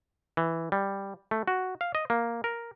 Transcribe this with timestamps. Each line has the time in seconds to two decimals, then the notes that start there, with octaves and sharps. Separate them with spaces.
0.37 E3
0.72 G3
1.31 A3
1.48 F#4
1.81 F5
1.95 D#5
2.10 A#3
2.44 A#4